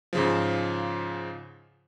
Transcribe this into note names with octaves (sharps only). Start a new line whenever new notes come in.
G#2 C#3 F3